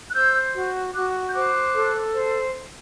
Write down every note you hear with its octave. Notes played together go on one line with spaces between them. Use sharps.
F#6
C5 E6 G6
F#4
F#4 D6 F#6
G6
C5 D6 F#6
A4
C5